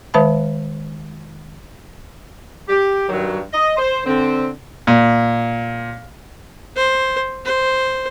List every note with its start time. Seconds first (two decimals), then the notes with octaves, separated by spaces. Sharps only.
0.14 D#3 G#3 B4 E5 A5 B5
2.69 G4
3.09 G2 D#3 F#3
3.53 D#5
3.77 C5
4.06 D3 C4
4.87 A#2
6.76 C5
7.45 C5